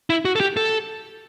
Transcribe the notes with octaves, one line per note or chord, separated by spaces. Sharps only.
E4
F#4
A4
G4
A4